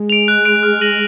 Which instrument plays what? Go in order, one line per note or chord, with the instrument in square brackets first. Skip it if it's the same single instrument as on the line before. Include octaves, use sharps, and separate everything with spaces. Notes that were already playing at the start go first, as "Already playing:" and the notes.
Already playing: [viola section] G#3
[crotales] D7 F7
F#6
D7 F7
F6
A#6 D#7 F#7